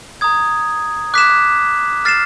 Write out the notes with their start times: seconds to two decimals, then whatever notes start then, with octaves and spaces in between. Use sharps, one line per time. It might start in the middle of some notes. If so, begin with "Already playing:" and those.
0.21 A#5 D#6 G#6
1.14 D6 F#6 B6 E7
2.05 F6 A6 C7 E7